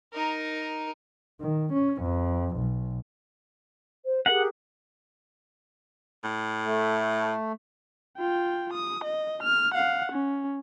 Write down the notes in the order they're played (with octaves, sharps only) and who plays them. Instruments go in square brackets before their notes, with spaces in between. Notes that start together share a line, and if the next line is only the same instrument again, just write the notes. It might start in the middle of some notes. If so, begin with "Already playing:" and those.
[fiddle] D#4 A#4
[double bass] D#3
C#4
F2
B1
[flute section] C5
[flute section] G4 G#4 A#4 [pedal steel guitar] F#5
[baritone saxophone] A2
[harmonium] A3
[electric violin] F4 G5
D#6
D#5
F6
F5 F#5
C#4